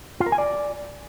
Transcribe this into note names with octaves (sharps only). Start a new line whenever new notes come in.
F4
A#4
G#5
D5